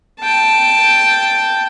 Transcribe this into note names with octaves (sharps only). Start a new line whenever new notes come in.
G5 A5